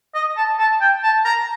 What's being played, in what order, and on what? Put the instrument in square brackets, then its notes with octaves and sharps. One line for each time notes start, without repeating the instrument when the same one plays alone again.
[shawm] D#5
A5
A5
G5
A5
A#5